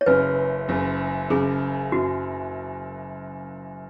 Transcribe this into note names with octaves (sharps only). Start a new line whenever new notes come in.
C#5
F#1 F#2 C#3 B4
F#1 F#2 C#3
F#1 F#2 C#3 G#4
F#1 F#2 C#3 F#4